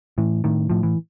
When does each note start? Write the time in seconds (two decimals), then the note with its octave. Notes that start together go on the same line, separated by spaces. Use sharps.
0.18 A2 E3
0.44 A2 D#3
0.70 A2 F3
0.83 E3